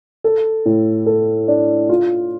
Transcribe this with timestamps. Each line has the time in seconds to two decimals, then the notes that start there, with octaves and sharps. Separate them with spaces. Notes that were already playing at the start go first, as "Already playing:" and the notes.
0.24 A4
0.66 A2
1.06 A4
1.48 D4
1.89 F4